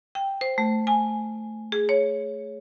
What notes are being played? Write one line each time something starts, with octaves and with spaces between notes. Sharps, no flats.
G5
C5
A3
G#5
G#4
C#5